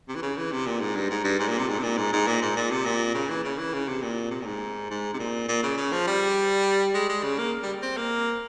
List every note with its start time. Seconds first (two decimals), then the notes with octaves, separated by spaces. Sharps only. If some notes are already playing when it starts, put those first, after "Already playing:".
0.08 C3
0.15 E3
0.22 C#3
0.37 E3
0.52 C3
0.66 A#2
0.81 G#2
0.96 G2
1.10 G#2
1.25 G2
1.39 G#2
1.49 A#2
1.59 C3
1.69 G#2
1.79 C3
1.83 A#2
1.97 G#2
2.13 G#2
2.27 A#2
2.42 G#2
2.56 A#2
2.71 C3
2.85 A#2
3.14 C#3
3.30 E3
3.44 C#3
3.58 E3
3.73 C#3
3.88 C3
4.02 A#2
4.31 C3
4.42 A#2
4.46 G#2
4.90 G#2
5.14 C3
5.19 A#2
5.48 A#2
5.63 C#3
5.77 C#3
5.92 F3
6.07 G3
6.94 G#3
7.09 G#3
7.23 C#3
7.38 A#3
7.63 G3
7.82 C4
7.97 A#3